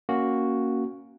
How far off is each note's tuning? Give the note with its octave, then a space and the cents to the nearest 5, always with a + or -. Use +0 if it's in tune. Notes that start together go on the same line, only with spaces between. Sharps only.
A#3 +0 C#4 +0 F#4 +0